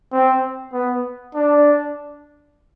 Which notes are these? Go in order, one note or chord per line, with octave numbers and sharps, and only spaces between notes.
C4
B3
D4